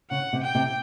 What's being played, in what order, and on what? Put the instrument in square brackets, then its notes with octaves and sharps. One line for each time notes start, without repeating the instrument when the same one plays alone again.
[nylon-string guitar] C#3 [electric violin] F#5
[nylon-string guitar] C3
[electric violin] G5
[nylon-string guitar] C3